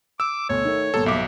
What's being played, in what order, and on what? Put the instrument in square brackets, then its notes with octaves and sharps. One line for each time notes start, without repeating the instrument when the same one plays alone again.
[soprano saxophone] D6 [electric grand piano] E6
[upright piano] D2 B2 [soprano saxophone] C#5
[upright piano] D#3 A3
[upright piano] G1 A#2 [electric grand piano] A4
[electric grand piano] B1 D6 [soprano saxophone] E5